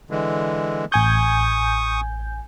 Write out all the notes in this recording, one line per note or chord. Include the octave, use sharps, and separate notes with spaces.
D3 E3 G#3
A1 G#5 C#6 D#6 G6